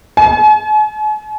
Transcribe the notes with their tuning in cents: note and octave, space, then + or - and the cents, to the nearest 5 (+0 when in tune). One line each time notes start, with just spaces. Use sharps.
G#5 +45